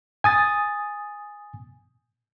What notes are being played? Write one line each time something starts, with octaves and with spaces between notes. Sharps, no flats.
G#5 D#6 A6